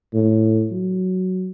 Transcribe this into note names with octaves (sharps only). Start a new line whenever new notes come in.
A2
F#3